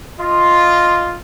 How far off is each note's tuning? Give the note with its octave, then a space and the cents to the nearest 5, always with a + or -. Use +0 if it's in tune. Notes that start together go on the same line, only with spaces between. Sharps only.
F4 +0 D#5 +0